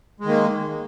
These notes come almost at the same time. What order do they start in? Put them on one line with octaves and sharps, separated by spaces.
G#3 D#3 A#3